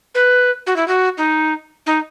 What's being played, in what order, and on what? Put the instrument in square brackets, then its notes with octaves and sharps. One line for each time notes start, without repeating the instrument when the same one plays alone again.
[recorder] B4
F#4
E4
F#4
D#4
D#4